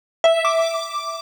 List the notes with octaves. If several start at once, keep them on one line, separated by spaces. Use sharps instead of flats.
E5
D6